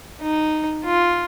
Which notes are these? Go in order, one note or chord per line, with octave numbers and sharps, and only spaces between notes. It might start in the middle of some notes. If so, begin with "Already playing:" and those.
D#4
F4